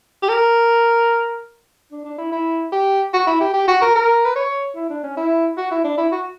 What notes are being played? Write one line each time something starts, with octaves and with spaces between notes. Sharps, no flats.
G4
A#4
D4
D4
E4
E4
G4
F#4
E4
G4
G4
F#4
A#4
A#4
B4
C#5
E4
D4
C#4
E4
F#4
E4
D4
E4
F#4